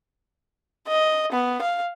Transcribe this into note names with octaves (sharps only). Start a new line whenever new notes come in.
D#5
B3
F5